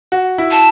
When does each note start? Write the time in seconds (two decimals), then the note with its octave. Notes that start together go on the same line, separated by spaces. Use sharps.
0.12 F#4
0.38 E4
0.51 A5